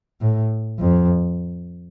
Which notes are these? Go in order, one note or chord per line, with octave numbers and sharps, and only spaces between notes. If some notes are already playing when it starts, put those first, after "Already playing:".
A2
F2